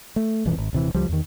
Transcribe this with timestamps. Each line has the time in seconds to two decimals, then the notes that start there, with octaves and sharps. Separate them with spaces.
0.16 A3
0.46 D#1 C2 F2 E3
0.58 G#1
0.73 D#1 C3 E3
0.94 C#2 F3 G3
1.09 E2 D#3